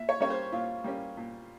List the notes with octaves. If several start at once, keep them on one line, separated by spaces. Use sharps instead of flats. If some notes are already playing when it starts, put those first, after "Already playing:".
Already playing: A#2 E5
C#5
G3 A#3 C#4 C#5
C5
A#2 F4
G3 A#3 C#4
A#2